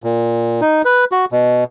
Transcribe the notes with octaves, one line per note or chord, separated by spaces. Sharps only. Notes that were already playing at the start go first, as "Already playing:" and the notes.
A#2
D#4
B4
F#4
B2